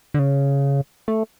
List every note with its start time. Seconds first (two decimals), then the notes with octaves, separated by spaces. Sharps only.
0.14 D3
0.19 C#3
1.08 A3